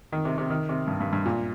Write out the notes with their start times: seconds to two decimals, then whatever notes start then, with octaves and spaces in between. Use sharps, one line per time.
0.12 D#3
0.25 C3
0.38 C3
0.50 D#3
0.69 C3
0.87 G2
1.00 G2
1.13 G2
1.26 A#2